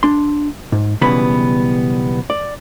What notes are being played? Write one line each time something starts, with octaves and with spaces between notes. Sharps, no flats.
D4 C6
G#2
B1 C#3 E3 G3 B3 B5
D5